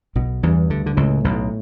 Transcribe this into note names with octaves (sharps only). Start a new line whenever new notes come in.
B1 B2
E2 G2 E3
D2 D3
D3
C#2 A2 C#3
B1 B2